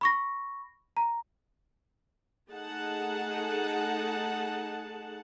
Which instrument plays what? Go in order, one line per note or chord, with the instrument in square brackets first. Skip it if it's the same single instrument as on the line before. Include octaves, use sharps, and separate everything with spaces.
[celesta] B5 C#6 A#6
A#5
[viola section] A3 D#4 G#4 F#5 A5